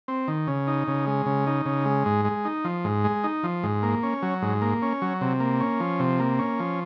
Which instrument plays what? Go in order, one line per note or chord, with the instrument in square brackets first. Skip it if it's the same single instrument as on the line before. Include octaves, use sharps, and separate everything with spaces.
[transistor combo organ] C4
D#3
C#3
D#4
C#3
G#3
C#3
D#4
C#3
G#3
G#2
G#3
D#4
F3
G#2
G#3
D#4
F3
G#2
A#3
C#4
F#3
G#2
A#3
C#4
F#3
C3
A#3
C#4
F3
C3
A#3
C#4
F3